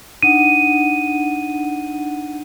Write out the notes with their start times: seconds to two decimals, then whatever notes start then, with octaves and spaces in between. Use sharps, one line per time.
0.23 D4 D#4 F#5 D#7